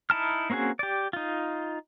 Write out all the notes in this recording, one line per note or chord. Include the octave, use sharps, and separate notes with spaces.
D#4 E4 A5 F6
A#3 C4 C#4 F#4 G#4
G4 D5
D#4 F4